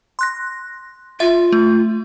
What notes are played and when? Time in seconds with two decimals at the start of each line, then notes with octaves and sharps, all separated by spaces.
0.19 C6 F#6 A#6
1.20 F4 E5
1.52 A3